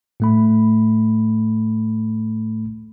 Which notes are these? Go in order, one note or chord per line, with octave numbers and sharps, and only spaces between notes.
A2 A3 B5